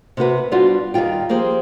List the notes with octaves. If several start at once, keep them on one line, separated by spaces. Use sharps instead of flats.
C3 A#3 F#4 B4
G3 B3 D4 F4 F#4
D#2 D#3 G3 F4 G5
F3 A#3 G4 G#4 C5